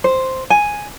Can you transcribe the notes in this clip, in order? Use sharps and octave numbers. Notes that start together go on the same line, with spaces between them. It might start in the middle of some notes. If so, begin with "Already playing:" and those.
C5
G#5